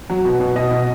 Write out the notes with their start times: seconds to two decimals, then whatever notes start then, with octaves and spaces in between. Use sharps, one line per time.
0.10 F#3
0.25 B2
0.40 B2
0.56 B2 D#5
0.71 B2